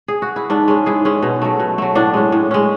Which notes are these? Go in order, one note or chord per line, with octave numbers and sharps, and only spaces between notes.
G#4
F#4
E4
G#2 D4
G#3 C#4
G#2 E4 G#4
G#3 C#4
B2
F#3 A3
B2
F#3 A3
A2 D4 F#4
G#3 C#4
A2
G#3 C#4